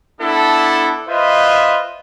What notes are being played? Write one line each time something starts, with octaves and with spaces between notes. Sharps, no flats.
B3 D4 E4 A4
F4 B4 C5 D#5 E5